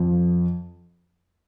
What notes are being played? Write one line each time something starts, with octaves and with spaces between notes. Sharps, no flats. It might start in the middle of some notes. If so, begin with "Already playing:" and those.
Already playing: F2